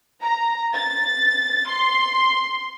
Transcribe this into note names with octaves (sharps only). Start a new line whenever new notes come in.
A#5
A6
C6